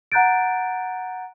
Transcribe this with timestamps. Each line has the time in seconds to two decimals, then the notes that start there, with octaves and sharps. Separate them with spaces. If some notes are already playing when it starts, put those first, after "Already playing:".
0.12 F#5 A#5 F#6 G6 A6 D7